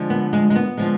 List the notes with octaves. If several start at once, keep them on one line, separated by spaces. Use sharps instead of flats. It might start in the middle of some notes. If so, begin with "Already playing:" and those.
Already playing: D3 F3 G#3
B3
G#3
G#3
B3
D3 F3 G#3